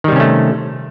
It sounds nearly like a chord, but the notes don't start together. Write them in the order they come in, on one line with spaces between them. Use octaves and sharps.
D#3 G3 C3 C#4 A3